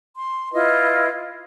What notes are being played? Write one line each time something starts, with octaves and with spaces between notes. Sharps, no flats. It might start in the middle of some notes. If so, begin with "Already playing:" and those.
C6
E4 F4 B4 D#5